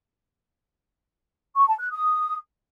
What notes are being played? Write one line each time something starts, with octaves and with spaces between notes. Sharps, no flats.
C#6
A5
F#6
D#6